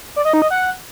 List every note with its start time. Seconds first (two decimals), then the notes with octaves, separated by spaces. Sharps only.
0.16 D5
0.25 D#5
0.33 D#4
0.42 D#5
0.51 F#5